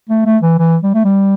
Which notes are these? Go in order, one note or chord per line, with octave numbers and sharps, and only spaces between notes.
A3
A3
E3
E3
G3
A3
G3